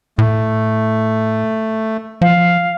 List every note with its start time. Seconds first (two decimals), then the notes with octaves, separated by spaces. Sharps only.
0.18 A2 A3
2.22 F3 F5